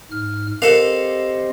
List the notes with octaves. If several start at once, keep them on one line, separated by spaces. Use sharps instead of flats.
G#2 F6
C4 G4 A4 A#4 D#5 F5